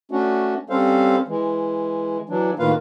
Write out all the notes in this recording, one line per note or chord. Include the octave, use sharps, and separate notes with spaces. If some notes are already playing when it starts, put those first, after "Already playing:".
A3 C#4 D4 F#4
G3 C4 C#4 A4 C5 F5
E3 G#3
E3 F#3 D4
A2 D#3 A#3 F4 B4 F5